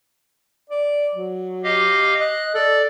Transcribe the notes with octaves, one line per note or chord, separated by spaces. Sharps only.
D5
F#3
G4 D#5 F5
D#5 F#6
A4 D5